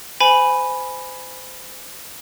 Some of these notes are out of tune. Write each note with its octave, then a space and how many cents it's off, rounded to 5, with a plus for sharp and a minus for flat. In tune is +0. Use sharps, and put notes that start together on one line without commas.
C5 -30 G#5 +0 B5 +0